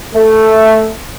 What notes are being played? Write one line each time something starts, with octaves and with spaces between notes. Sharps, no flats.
A3